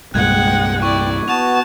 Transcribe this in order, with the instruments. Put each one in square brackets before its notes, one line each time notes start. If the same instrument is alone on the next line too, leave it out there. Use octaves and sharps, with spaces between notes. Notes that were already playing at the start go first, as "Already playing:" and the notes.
[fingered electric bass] C2 G2 A#2 [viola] G#3 F#5 [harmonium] G5 [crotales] F#6 G#6
[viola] E4 D5 [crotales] C#6
[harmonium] B3 F#4 [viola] A5 [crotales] C#6 F7